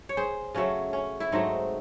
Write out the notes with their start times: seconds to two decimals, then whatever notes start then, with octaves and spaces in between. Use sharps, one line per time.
0.09 C#5
0.17 G#4 C5
0.55 C#3 F#3 A3 C#4
0.93 C#4
1.20 E4
1.32 G#2 F#3 A3 C4 D#4